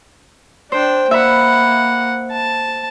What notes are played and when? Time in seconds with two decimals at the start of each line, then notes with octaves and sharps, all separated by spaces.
0.72 D4 C5 G5
1.11 A#3 E5 F#5 B5
2.32 A5